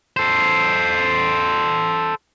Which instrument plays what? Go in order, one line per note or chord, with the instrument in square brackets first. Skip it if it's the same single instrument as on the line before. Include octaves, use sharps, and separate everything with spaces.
[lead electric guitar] A4 C5